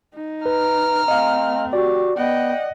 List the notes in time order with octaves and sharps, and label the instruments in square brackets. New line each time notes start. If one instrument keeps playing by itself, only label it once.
[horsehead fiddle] D#4
[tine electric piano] B4 [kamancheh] A#5 F6
[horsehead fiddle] A3 C4 [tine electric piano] D#5 F5
[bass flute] F#4 [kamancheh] G4 [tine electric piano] D5
[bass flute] B3 [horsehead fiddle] D#5 F#5 [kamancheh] G5